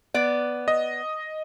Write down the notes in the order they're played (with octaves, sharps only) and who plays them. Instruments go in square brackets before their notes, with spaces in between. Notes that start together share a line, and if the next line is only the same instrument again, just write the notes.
[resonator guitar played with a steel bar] B3 D5
[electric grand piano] D#5